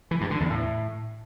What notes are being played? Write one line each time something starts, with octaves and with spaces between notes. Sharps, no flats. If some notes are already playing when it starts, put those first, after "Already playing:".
E3
G2
D3
E2
A2